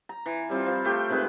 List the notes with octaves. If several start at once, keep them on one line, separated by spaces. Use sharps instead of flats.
A#5
E3
G3 C4 F4
F3 F4
A3 G4 G5
C3 D#3 G#3 B4